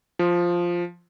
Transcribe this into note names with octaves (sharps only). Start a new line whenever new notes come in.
F3